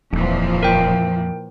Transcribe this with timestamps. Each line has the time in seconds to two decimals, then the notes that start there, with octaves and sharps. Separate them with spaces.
0.13 D#1 F2 A#2 E3 F3
0.63 A#4 G5